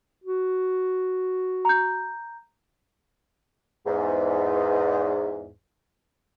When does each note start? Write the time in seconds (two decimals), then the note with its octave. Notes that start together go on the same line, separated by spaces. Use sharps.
0.24 F#4
1.65 A#5 G6
3.86 E2 G#2